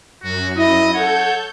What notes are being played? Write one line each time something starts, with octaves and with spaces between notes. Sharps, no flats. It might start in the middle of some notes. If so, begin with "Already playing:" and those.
F#2 F#4
E4 D#5
A4 C#5 F#5 G6